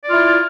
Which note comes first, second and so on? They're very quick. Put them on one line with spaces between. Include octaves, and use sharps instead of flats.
D5 F4 E4